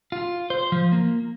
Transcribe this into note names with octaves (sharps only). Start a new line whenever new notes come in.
F4
C5
F3
A#3